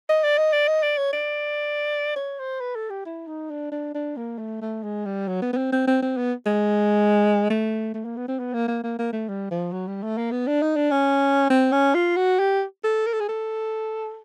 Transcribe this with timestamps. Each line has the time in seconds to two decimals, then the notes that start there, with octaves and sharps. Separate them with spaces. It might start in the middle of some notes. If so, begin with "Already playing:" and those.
0.09 D#5
0.24 D5
0.38 D#5
0.53 D5
0.68 D#5
0.83 D5
0.98 C#5
1.13 D5
2.16 C#5
2.39 C5
2.60 B4
2.76 A4
2.90 G4
3.05 E4
3.27 D#4
3.50 D4
3.72 D4
3.95 D4
4.17 A#3
4.38 A3
4.61 A3
4.83 G#3
5.05 G3
5.28 F#3
5.42 B3
5.53 B3
5.57 C4
5.72 C4
5.88 C4
6.02 C4
6.17 B3
6.46 G#3
7.50 A3
7.94 A3
8.05 A#3
8.17 B3
8.28 C4
8.39 B3
8.54 A#3
8.68 A#3
8.84 A#3
8.99 A#3
9.13 A3
9.29 G3
9.51 F3
9.72 F#3
9.88 G3
10.03 A3
10.18 A#3
10.31 B3
10.47 D4
10.62 D#4
10.76 D4
10.91 C#4
11.50 C4
11.72 C#4
11.94 F4
12.17 F#4
12.40 G4
12.84 A4
13.06 A#4
13.13 A4
13.20 G#4
13.29 A4